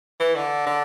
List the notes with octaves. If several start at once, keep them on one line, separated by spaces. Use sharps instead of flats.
E3
D3
D3